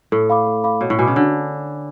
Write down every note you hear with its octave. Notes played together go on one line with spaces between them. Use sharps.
A2 A4
F5 B5 D6
A4
F5 B5 D6
B2 C#5
A2
B2 G#5 B5 D6
C#3
D3 C#5